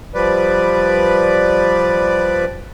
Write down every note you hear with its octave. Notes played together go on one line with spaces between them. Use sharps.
F3 G3 B4 D5